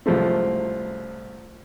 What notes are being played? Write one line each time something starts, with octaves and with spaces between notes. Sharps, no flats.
C2 F#2 F3 G#3 A3 C4